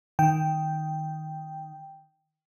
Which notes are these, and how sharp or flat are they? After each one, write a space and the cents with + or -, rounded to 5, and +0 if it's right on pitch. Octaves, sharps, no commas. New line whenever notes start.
D#3 +0 G5 +0